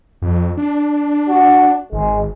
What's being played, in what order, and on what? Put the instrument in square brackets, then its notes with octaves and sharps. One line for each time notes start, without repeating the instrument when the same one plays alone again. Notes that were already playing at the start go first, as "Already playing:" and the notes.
[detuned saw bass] F2
D4
[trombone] F#4
[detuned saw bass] G#1 [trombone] G#3